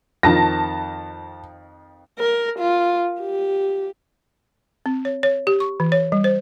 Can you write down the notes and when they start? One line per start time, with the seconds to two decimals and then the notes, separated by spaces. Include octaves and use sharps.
0.23 F2 D#3 A5 A#6
2.19 A#4
2.59 F4
3.21 G4
4.86 C4
5.05 C#5
5.23 C#5
5.47 G4
5.60 C#6
5.80 E3
5.92 C#5
6.12 G3
6.24 C5